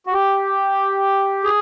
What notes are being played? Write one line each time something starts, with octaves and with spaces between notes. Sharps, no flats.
F#4
G4
G#4